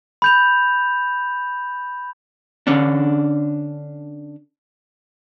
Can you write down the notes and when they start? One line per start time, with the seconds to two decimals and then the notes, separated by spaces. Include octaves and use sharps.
0.22 B5 G6 F7
2.67 D3 C#4 D4